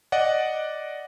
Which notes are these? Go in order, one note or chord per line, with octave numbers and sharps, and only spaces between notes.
D5 D#5 F#5